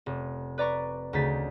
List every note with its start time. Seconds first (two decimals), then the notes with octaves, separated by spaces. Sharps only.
0.06 F1
0.58 B4 D5 A#5 C#6
1.13 D2 C#3 D#4 A6 B6